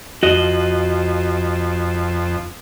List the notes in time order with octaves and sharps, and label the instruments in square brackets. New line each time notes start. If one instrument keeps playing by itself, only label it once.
[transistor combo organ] F2 [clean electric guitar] F#4 D#5